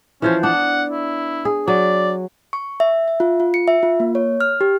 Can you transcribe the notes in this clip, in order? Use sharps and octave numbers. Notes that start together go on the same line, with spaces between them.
E3 F3 C#4 C5
B3 D4 F#5
E4
G#4
F#3 D5
C#6
E5
E5
F4
F4
C#7
E5
F4
A#3
C#5
F6
G4